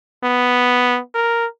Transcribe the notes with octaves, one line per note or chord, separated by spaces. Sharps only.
B3
A#4